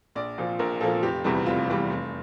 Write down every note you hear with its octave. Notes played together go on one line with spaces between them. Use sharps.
A#1 D5
A#2 F3
A#1 A#4
A#2 F3 A4
F1 G4
E2 C3 E3 G3
F1 F4
E2 C3 E3 G3
F1